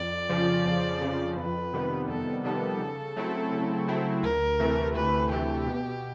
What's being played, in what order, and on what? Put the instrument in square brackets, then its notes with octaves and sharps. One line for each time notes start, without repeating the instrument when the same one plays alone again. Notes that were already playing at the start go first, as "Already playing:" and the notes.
Already playing: [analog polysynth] F2 [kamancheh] D5
[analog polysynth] C#3 F3
F2
C#3 F3
[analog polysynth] F2 [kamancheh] B4
[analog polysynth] C3 D#3 G3 B3
[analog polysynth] F2 [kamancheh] A4
[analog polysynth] C3 D#3 G3 B3 [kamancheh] A4
[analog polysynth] C#3
F#3 A3 C4 E4
C#3
F#3 A3 C4 E4
[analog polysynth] D2 [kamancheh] A#4
[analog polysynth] C3 E3 A3
[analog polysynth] D2 [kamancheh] B4
[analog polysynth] C3 E3 A3 [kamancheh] G4
[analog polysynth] B2